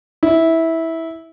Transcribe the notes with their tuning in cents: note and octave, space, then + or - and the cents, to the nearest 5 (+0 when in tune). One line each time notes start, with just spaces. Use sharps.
E4 -15